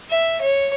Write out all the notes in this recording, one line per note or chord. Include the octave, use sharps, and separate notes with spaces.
E5
C#5